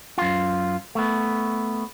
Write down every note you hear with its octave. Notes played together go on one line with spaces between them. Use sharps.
F#2 F4
A3 B3